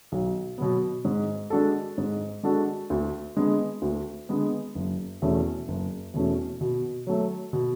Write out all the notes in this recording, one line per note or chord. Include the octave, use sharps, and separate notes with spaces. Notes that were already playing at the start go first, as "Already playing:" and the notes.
B1
B2 F#3 B3
G#2
G#3 D4 F#4 A4
G#2
G#3 D4 F#4 A4
D2
D3 G#3 B3
D2
D3 G#3 B3
F#1
E2 B2 A3 C#4
F#1
E2 B2 A3 C#4
B2
F#3 A3
B2